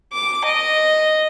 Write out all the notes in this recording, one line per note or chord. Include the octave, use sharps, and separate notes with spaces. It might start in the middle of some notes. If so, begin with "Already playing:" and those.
D6
D#5